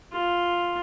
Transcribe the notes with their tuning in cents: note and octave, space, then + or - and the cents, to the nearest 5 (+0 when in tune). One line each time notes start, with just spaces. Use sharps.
F4 +5